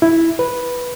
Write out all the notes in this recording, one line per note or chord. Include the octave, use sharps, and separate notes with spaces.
E4
B4